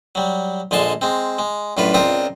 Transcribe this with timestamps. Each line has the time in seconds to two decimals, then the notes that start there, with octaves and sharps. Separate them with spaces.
0.15 F#3 G3
0.71 A#1 D3 G#3 G#5 A5 C6
1.01 G#3 C4
1.39 G#3
1.77 F#2 A2 D4 F4 B4
1.94 C#2 C4 D4 F4 A#4 D#6